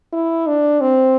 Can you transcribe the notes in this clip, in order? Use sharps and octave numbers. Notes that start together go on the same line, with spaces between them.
E4
D4
C4